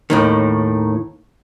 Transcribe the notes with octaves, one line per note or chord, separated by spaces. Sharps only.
D#2 A2 D#3